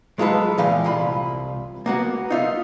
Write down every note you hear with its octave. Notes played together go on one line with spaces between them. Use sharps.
F#3 G#3 F4 A4 B4
A#2 E3 F5 G5
C2 F4 B5
A#3 B3 F#4
D#4 F4 E5